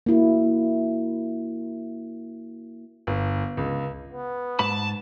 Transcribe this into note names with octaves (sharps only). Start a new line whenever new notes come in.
A#3 E4 F#4
G1
C#2
B3
G#2 A5 B5